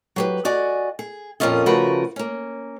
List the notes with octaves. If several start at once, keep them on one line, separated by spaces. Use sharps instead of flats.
F#3 G4 B4
F#4 D5 D#5 G#5
G#4
F2 A#2 A#3 C#4 F4 D#5
C#3 F3 A3 F#4 A#4 B4
A#3 C#4